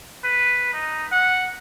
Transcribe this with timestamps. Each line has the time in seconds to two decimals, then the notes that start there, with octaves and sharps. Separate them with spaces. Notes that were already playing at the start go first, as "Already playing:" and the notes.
0.24 B4
0.73 D#4
1.12 F#5